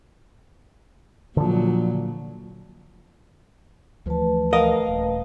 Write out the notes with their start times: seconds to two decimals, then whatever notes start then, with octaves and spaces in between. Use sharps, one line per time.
1.37 A#2 D3 F3 F#3
4.06 D2 E3 F3 A3 B4 A5
4.53 A#4 D#5 F5
4.89 D#1